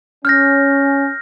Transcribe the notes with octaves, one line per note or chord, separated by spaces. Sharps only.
C#4 F6 G6 A#6